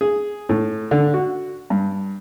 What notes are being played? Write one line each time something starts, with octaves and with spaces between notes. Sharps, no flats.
G#4
A2
D3
F#4
G2